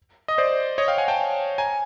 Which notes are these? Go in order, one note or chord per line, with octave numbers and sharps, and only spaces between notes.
D#5
C5 D5
C#5 D#5
F5 G5
F#5 G#5
G5 A5
G#5 A#5